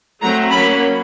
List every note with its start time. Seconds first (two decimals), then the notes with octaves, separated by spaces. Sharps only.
0.22 F#3 A3 C4 A#5
0.51 F#3 A#3 C#4 B5